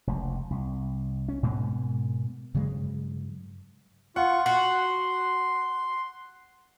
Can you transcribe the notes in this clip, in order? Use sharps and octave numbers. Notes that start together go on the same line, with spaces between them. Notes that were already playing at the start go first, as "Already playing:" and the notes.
F1 C#2
C2
C#4
G#2 B2 G#3 A#3
G2 C#3 F#3 G#3
F4 F#5 C#6
F#4 C6